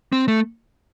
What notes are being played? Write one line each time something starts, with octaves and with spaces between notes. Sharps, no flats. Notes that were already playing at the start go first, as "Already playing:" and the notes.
C4
A3